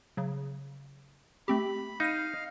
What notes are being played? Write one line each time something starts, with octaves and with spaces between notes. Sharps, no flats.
C#3 F#3
A3 C4 G4 B5
D#4 F5 G6 D#7